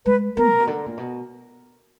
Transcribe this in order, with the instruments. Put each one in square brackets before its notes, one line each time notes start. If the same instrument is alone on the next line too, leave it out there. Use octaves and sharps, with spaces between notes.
[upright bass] G#3 [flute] B4
[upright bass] B3 [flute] A#4
[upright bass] A#2
B2
D3
A#2
B2